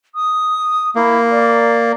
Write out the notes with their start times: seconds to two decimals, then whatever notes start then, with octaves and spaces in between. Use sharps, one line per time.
0.14 D#6
0.95 A#3 E4
1.30 D5